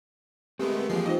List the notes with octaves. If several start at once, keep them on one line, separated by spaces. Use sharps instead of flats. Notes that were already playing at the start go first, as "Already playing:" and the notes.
G#3 A3 B3 C4 G4 A#4
E3 F3 G#3 A#3 G5 C7
D#4 F4 C5 D#5